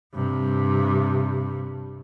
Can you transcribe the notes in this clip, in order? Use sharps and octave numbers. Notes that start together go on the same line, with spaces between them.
G2 C3